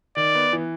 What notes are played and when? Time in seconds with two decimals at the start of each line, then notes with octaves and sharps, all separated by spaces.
0.16 D#3 D5
0.35 B3
0.53 E3